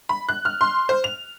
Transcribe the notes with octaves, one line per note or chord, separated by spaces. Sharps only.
B5
F#6
F6
C6
C5
F7